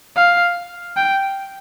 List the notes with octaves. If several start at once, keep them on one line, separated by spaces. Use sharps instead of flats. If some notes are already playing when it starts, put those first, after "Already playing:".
F5
G5